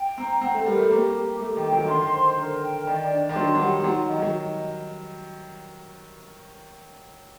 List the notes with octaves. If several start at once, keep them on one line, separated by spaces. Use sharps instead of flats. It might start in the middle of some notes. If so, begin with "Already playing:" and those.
Already playing: G5
C4 A#5
C4 F#5
A3
G3 A#4
A3
A#3 G4
G4
A3 G4
D#3
G5
F#3
D#3
D3 C6
D#3
C5
D3 A#4
G5
D#3 D5
D4
D#3
F#3 C6
F#3
G3 F#5
G3
F#3 D#4
D#3 D#5
F#3